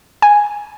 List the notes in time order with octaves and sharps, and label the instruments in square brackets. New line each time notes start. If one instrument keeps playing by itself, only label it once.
[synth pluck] G#5